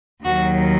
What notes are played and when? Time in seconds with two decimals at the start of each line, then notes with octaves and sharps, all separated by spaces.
0.23 D#2 D#3 F#3 F#4